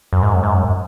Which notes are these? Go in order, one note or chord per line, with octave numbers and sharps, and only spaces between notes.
F#2
G#2
F#2
G#2
F#2